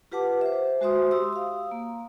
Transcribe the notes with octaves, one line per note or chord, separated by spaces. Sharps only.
F4 G4 B4 F#5 A5 D6
C5 E5
G#3 F#4 C5 E5 C6 D#6
G4 C6 D#6 E6
F5 D#6
A#3